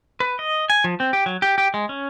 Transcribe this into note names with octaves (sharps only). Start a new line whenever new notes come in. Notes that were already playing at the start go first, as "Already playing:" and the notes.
B4
D#5
G#5
F3
C4
G4
F#3
G4
G4
G#3
C#4